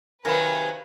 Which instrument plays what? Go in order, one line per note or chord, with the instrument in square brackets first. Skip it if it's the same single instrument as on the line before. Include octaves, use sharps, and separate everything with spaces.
[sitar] C3 D#3 F#3 [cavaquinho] A#4 F5 B5 [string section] B4 [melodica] G#5